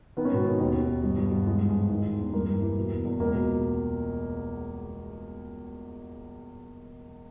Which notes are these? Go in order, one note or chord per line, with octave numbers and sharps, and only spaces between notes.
D#3 B3
C#4
G#2 B2 B3
D#3
D#2
D#3
D#2
G2
G2
G2
E3 G#3
G#2
G#3
G#2
D#3
D#3
E2
G2 A#3
G2
E3
B2
E2
E2
C#2 A#3
B2